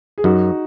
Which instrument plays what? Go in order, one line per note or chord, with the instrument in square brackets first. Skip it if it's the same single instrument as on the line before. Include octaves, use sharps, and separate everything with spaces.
[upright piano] G#4
[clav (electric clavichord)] F#2 [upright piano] D#4 F#4